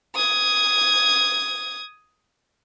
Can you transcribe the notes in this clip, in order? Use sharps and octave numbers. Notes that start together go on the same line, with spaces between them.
D#6 G#6